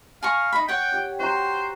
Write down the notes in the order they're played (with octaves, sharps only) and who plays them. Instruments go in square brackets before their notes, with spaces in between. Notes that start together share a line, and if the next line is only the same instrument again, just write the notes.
[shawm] F5 [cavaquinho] G#5 A#5 C#6
[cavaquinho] D#4 B5
[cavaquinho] C#5 F#5 [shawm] G5
[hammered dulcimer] G4
[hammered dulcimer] F#4 A#5 [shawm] C5